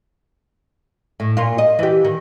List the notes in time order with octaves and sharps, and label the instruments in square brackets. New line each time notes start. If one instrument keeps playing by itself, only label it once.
[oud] A2
A#2 F4
D#5
E3 G4
D#3